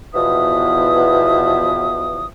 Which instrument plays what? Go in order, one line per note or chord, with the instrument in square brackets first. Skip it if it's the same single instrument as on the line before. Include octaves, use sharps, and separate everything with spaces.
[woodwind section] E2 B2 E3 F3 E5 D#6